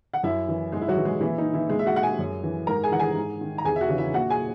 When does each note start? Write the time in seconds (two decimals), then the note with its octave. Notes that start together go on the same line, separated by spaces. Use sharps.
0.14 F#5
0.23 F#2 E4 E5
0.49 E3
0.72 G#2 G#3 G#4
0.81 E4
0.88 F#3 F#4
0.97 E3
1.05 G#3 G#4
1.21 A#2 E3 E4
1.38 D#4
1.53 E3 E4
1.70 A#2 G#3 G#4
1.79 E5
1.86 F#4 F#5
1.96 F#5
2.03 G#4 G#5
2.19 F#2
2.43 E3
2.67 G#2 A#4 A#5
2.84 G#4 G#5
2.92 E3 F#5
2.99 G#4 G#5
3.16 G#2
3.41 D#3
3.58 A#5
3.64 E2 G#4 G#5
3.76 E5
3.81 F#4 F#5
3.89 C#3 E3
3.98 E4 E5
4.14 A#2 F#4 F#5
4.29 G#4 G#5